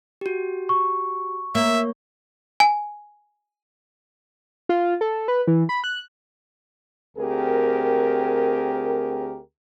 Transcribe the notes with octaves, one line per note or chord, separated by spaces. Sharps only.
F#4 G4
C#6
A#3 C#5 E5
G#5
F4
A4
B4
E3
B5
F#6
D2 C4 G4 G#4 A#4